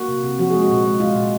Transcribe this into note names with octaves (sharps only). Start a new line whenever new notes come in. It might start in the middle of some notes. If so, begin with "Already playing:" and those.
Already playing: A#3 F#4
C3
C3
F3 F#4
G#3 G#4
F#4
A#2
G#3
G#3 F4
A#2